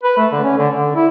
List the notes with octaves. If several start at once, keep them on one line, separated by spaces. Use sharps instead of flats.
B4
A3
D3
C#4
D3
D3
E4